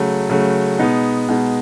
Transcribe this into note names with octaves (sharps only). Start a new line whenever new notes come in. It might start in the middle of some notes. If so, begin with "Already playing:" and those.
Already playing: C#3 F#3 A3
C#3 F#3 A3
B2 G#3 B3 D#4
B2 G#3 B3 D#4